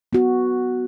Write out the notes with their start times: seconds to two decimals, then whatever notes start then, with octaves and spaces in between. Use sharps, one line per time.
0.13 B3 F#4